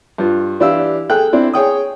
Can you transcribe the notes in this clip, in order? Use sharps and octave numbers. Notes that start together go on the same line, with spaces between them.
G2 F4
E3 D4 E4 G4 F5 E6
G#4 A4 G5 F#6
C4 D4 E4
G#4 C#5 G5 D#6